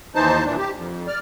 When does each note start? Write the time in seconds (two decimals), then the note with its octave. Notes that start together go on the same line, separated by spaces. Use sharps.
0.15 D#2 E3 D#4 C5 A5
0.45 A#2 E3 D4
0.58 G4
0.75 F2
1.07 D5 F6